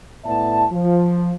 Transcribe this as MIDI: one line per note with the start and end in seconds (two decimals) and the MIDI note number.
0.25 0.64 45
0.25 0.64 59
0.25 0.64 74
0.25 0.64 76
0.25 0.64 81
0.70 1.32 53